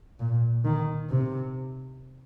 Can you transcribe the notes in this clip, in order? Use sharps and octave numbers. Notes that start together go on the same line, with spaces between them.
A#2
D#3
C3